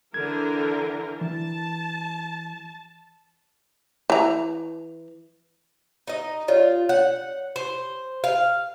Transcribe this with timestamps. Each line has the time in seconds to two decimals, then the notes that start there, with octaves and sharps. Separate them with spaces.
0.14 D3 E3 A#4 G#6
1.21 E3 A5
4.10 E3 A#5
6.07 D#4 D#5
6.48 F4 A#4 C#5 D5
6.89 C#5 F#5
7.56 C5
8.24 F5